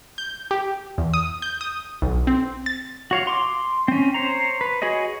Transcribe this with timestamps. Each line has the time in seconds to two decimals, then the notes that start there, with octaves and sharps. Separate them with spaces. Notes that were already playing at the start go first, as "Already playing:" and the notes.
0.18 G6
0.51 G4
0.98 E2
1.14 D#6
1.42 G6
1.61 D#6
2.02 B1
2.27 C4
2.66 A6
3.11 F#4 C#5 F5
3.27 C6 D6
3.88 C4 C#4
4.14 C5 C#5 A#5
4.61 B4
4.82 F#4 G#4 C#5 D#5